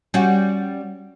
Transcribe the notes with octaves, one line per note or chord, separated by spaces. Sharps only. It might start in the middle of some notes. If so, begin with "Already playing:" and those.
G3 C#4 F#4